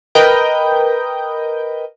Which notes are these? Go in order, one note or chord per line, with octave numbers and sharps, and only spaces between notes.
A#4 B4 D#5 G5 G6